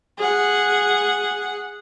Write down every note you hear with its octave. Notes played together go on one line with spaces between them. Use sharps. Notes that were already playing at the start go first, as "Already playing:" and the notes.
G#4 F#5